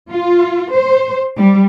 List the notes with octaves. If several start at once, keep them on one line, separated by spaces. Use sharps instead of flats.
F4
C5
G3